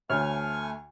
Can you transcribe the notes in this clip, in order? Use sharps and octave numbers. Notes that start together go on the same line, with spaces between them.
D2 A3 C#5 G#5 C#6 F6